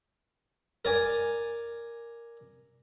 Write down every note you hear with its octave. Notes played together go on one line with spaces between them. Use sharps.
A#4 D5 G#5